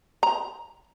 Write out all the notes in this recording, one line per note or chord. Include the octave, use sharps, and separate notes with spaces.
A#5